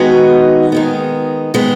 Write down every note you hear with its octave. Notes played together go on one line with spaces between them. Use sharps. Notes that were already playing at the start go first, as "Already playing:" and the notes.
Already playing: D#3 G#3 B3 D#4 F#4
D#3 G#3 B3
D#3 G#3 B3